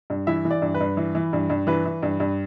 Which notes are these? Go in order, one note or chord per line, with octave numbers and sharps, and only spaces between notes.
G2
E3 E4 E5
E3
D5
G2
B4
G2
E3
E3
G2
G2
E3 B4
E3
G2
G2